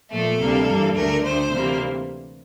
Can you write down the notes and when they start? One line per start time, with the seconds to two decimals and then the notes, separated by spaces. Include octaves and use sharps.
0.11 A#2 F3 A3 A4
0.39 D2 C3 G3 A#3
0.68 G2 E3 G3 A#3
0.95 D2 D3 A3 A#4
1.24 D2 D3 A3 C5
1.52 D2 C3 E3 G3 A#3